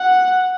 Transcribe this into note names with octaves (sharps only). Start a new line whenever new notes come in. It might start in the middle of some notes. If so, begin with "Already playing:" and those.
Already playing: F#5